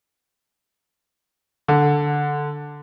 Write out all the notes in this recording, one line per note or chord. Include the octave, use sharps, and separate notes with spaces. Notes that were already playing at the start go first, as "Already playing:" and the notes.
D3